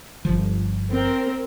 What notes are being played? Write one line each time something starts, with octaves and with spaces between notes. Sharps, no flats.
G1 F3
C4 A#4